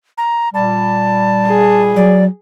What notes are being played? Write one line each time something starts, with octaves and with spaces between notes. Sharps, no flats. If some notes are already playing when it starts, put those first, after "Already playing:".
A#5
A#2 G3 A5
G#4
F#3 D5